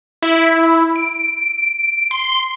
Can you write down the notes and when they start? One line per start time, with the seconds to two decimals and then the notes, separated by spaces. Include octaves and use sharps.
0.22 E4
0.96 D7
2.11 C6